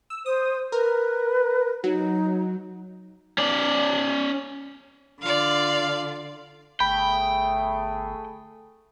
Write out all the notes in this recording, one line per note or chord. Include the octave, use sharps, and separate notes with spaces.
E6
C5 D#6
A#4 B4
F#3 D#4
C#4 D5
D3 F4 D5 F5
G1 A3 G#4 G5 B5